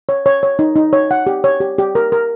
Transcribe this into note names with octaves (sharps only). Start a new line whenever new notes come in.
C#5
C#5
C#5
D#4
D#4
C#5
F#5
G4
C#5
G4
G4
A#4
A#4